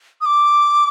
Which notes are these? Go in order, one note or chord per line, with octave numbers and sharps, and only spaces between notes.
D#6
D6